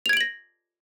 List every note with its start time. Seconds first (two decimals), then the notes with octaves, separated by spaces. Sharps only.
0.06 F7
0.09 G#6
0.13 D7
0.17 F#7
0.21 A#6